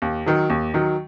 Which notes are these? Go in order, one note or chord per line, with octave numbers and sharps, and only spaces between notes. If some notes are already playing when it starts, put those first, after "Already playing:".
D#2
D#3 F#3
D#2
D#3 F#3